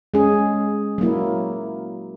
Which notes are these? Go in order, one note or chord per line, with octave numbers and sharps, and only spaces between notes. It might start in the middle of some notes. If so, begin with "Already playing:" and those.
G#3 C#4 G#4
F#3 A#3 E4